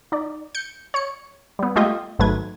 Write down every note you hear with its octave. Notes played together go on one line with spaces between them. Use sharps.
D#4 D5
G6 C#7
C#5 C#7
G3 B3
G#3 A3 F4 G4 D#5
G#1 G#2 F#3 A3 B4 G#6